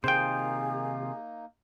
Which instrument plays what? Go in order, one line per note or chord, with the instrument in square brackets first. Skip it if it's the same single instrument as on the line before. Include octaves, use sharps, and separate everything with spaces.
[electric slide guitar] C3 D#3 F4 [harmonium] A#3 D#4 [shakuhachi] G#4 [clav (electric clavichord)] C5 G5